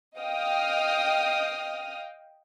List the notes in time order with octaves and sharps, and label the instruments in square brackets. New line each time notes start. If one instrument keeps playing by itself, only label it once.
[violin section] D#5 F5 G5 D#6 F6